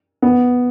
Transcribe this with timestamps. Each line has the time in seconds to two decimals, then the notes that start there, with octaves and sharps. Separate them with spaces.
0.22 B3